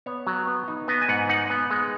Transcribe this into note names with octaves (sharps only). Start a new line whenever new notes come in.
B3 C#5
F#3
B3
D#4
B3 D#5
G#5
G#2 F#5
D#4 F#5
B3
G#3